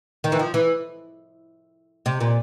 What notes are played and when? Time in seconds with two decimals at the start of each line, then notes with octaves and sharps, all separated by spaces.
0.24 D#3
0.32 E3
0.39 F3
0.54 E3
2.06 C3
2.20 A#2